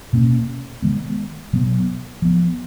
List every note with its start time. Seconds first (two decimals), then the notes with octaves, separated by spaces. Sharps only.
0.13 B2 A#3 C#4
0.82 D#3 G#3 B3
1.53 B2 F#3 B3
2.22 F3 B3